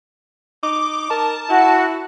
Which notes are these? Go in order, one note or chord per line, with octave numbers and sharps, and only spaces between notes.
D#4 D6
A#4 A5
E4 F#4